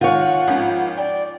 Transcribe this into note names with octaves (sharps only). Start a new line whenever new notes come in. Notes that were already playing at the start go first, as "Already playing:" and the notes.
D#3 G#3 F4 C#5 F#5
G#1 F3 C#4
D5 G5